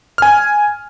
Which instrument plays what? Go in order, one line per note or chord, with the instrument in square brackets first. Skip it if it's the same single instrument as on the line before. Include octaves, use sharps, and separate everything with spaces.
[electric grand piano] G#5 F6